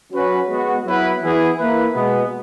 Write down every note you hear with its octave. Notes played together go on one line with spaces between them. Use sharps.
F#3 C#4 F#4 B4
G#3 B3 F#4
F#3 B3 E4 B4
E3 B3 E4 G#4
A#3 E4 B4
B2 G#3 B3